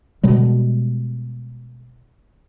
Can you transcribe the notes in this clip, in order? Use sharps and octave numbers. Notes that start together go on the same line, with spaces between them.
B2 G3 G#3